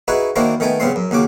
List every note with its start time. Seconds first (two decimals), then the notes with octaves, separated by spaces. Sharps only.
0.08 D#4 E4 F#4 G#4 B4 G#5
0.36 D#3 A#3 D4 E4 F#4 C5
0.60 D#3 A3 B3 G5 G#5
0.80 G2 C#3 B3 C4 C6
0.96 F#2
1.11 D#2 C#3 F#4 D6